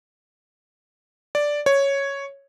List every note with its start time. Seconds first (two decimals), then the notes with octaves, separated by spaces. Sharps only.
1.35 D5
1.66 C#5